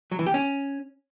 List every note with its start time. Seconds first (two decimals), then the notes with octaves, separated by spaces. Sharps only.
0.12 F#3
0.19 E3
0.27 G4
0.34 C#4